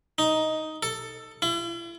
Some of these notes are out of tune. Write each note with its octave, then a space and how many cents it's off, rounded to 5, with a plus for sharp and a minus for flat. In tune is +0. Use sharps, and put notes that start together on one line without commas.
D#4 +10
A4 +15
E4 +45